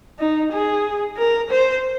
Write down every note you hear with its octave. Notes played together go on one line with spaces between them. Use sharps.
D#4
G#4
A#4
C5